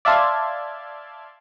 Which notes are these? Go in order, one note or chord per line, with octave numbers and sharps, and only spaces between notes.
D5 E5 F5 A5 C6 G#6